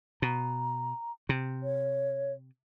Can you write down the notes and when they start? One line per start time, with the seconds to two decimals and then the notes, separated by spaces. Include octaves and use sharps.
0.22 B2 A#5
1.29 C3
1.63 C#5